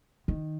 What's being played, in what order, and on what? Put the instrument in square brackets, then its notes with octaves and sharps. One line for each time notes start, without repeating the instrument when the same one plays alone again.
[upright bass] D#3